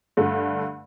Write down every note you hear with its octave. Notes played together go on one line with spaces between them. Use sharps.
G2 D3 A3